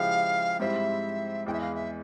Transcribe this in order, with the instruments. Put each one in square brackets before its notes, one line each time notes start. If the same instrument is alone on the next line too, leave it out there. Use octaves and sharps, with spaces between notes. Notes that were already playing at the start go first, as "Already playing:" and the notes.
Already playing: [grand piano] C#3 F3 G#3 E4 G4 [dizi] F5
[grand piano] G#2 G3 C4 E4 [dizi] E5
[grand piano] E2 E3 G#3 [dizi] G5
[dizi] E5
F5
E5